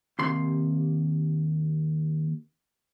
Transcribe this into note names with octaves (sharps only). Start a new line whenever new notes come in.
D#2 C3 C6